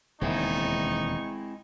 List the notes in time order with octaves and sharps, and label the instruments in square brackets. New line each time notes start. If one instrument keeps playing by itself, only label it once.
[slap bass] E1 D#2 C#3 [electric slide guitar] G#3 C4 E4 [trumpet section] D#4 C#6